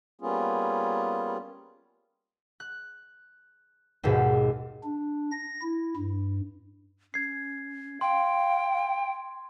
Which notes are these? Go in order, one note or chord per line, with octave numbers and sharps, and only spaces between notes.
G3 A#3 B3 C#4 F4 G#4
F#6
G#1 D#2 G#2 B2
D4
A#6
E4
G2
C#4 G#6 C7
F5 G5 C6